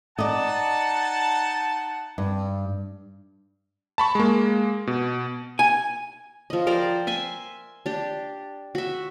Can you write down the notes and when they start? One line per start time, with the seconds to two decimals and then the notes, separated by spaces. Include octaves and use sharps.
0.19 D#4 D5 D#5 F#5 A5
2.18 G2
3.98 A5 B5 C#6
4.15 G#3 A#3
4.87 B2
5.59 G#5
6.50 F3 D#5
6.67 A#4 C5 D5 G5
7.07 E5 G#5 C6
7.86 D4 G4
8.75 F#4 E5